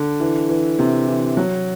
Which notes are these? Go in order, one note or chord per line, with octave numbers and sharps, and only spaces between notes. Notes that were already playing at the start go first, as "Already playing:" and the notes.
Already playing: D3
E3
E3
C3
E3
F#3